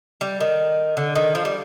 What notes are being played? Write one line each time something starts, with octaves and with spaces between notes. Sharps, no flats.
G3
D#3
D3
D#3
F3
G3